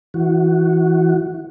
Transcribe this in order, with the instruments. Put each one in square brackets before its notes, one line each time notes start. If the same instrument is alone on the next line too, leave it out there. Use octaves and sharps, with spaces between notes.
[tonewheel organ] E3 F#4